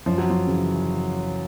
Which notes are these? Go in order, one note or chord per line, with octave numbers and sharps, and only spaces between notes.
F#2 F3
F#3
F3
C#3 E3